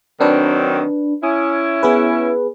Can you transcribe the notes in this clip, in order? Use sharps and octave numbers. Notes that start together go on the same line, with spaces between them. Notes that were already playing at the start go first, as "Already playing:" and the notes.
D#3 F#3 C4 D4 B4
C#4 E4 D#6
B3 G#4 B4